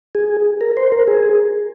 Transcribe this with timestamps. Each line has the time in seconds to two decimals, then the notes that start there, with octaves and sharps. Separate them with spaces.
0.15 G#4
0.61 A#4
0.77 C5
0.92 A#4
1.08 G#4